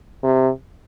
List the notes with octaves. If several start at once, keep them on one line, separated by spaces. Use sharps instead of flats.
C3